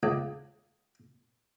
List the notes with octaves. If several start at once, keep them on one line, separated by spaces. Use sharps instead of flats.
C#2